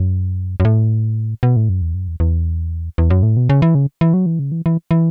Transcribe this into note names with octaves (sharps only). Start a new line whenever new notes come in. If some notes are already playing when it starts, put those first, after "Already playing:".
Already playing: F#2
F#2
A2
B2
A2
F#2
E2
F#2
E2
E2
E2
F#2
A2
B2
C#3
E3
C#3
E3
F#3
E3
C#3
E3
E3
E3